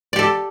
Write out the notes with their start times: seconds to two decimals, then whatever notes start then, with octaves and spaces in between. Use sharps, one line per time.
0.13 D5
0.16 G4
0.19 A4